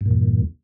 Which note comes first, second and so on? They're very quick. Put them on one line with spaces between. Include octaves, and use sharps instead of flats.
G2 A#2 E2